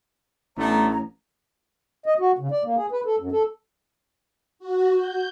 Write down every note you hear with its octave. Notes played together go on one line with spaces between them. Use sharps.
A1 A3 B3 D4 C#5 A#5
D#5
F#4
C#3
D5
A#3
G#4
B4
A4
F#2
A4
F#4
G6